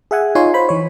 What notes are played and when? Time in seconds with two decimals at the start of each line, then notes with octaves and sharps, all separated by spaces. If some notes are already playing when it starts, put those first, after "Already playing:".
0.11 G#4 E5 F#5 G#5
0.35 D#4 F4 C#5 G#5 C6
0.54 C5 B5
0.69 E3 C#5